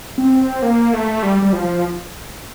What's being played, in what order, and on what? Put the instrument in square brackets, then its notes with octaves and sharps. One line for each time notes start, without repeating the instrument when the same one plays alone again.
[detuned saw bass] C4
A#3
A3
G3
G3
F3